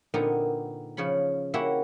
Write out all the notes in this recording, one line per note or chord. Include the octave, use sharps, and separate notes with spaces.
A#2 D3 B3 C4 D#4 A#4
C#3 F3 C#5 B5
A#3 C#4 E4 F#4 G4 E5